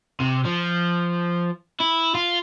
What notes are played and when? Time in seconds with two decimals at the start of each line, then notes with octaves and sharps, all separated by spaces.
0.20 C3
0.45 F3
1.80 E4
2.15 F4